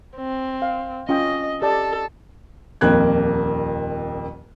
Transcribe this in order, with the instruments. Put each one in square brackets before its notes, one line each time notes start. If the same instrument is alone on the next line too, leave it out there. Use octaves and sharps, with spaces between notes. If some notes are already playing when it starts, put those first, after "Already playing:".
[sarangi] C4
[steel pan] F5
[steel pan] C#4 F4 G5 [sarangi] D#5
[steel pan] G4 D5 A5 [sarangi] A4
[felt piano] D#1 F2 A#3 F#6 G#6